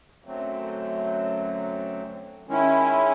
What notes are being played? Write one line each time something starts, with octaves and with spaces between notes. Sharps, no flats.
F#2 D3 F#3 A3 C4
D#3 G#3 C#4 E4